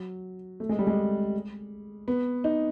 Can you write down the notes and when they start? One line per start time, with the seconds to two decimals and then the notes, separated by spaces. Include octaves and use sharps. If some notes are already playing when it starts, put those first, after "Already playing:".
Already playing: F#3
0.60 A3
0.69 G#3
0.79 G3
0.87 G#3
2.08 B3
2.44 D#4